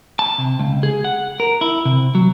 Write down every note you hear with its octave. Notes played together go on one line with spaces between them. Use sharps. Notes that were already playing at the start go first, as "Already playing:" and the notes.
A5
C3
C#2
G#4
F#5
A#4
E4
C3
F#3